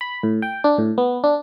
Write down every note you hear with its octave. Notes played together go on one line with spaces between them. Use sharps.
B5
A2
G5
D4
A2
B3
D4